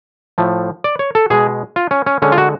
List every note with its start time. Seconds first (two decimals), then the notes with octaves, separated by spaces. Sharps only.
0.38 A2 F3 A3
0.84 D5
0.99 C#5
1.15 A4
1.30 B2 G#3 G#4
1.76 F4
1.91 C#4
2.06 C#4
2.22 D3 G#3 C#4
2.32 F4
2.38 F#4